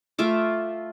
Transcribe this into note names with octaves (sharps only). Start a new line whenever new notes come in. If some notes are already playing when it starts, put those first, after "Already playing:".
A3 F4 E5 D6